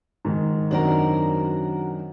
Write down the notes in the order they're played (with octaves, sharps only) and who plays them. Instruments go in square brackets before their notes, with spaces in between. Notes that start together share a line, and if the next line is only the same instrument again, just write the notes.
[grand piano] G#2 D#3
[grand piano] F#2 D#3 C4 [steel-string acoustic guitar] D4 F#4 A#4